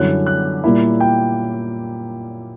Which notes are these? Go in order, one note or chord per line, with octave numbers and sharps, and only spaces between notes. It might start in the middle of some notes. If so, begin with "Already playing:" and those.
Already playing: F#2 D3 G3 C#4 E4 F#6
F#6
A#2 G3 A#3 E4
G5